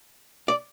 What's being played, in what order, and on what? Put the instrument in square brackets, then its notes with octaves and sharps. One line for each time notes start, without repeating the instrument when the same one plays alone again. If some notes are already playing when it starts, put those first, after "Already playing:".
[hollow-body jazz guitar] D5